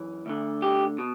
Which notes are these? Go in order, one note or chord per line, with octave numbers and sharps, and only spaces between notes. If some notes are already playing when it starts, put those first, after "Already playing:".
Already playing: F#2 E3
D2 D3
G4
B2